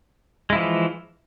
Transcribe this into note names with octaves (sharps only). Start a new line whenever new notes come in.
E3 F3 G#3 E4